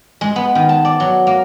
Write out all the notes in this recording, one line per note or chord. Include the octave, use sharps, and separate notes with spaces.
G#3
B3
D#3
A5
D5
F#3
A#3